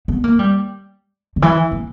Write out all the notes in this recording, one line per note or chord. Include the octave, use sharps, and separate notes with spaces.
B3
A#3
G3
D3
E3
A#3